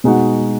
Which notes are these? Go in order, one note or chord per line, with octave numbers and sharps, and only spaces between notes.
B2 G#3 D#4 F#4